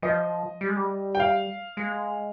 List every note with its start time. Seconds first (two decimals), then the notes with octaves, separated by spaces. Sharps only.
0.02 F3 D#5
0.61 G3
0.68 G#3
0.76 G3
1.15 G5
1.20 F5
1.77 G#3